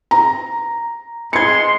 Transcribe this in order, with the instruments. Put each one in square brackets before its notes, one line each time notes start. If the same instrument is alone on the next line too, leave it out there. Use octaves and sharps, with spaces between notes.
[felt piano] A#5
[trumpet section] G#3 C6 [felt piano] G#6 C#7